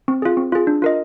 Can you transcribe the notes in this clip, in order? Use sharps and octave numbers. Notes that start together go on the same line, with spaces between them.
C4
F4 G#4
C4
F4 G#4
D4
F4 A#4 D#5